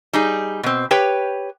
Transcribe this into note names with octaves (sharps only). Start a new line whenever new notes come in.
G3 D#4 G#4
B2 C4
G4 B4 C#5 G5